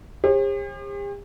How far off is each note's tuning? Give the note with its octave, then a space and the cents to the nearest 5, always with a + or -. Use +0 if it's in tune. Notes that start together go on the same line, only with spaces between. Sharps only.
G4 +45 C5 +45